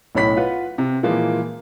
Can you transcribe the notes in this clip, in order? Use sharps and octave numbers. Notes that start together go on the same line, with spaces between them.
B1 A2 C#5 B5 B6
F4 B4 F#5
C3
A#2 E3 F3 G#3 A#3